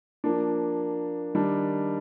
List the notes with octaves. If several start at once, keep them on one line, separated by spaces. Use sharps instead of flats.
F3 A#3 D4
D#3 G3 D4